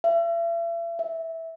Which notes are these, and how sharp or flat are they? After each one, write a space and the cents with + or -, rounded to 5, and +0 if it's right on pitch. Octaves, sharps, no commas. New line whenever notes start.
E5 +40
E5 -10